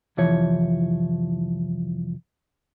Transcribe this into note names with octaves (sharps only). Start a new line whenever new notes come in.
C2 F2 E3 F3 C#5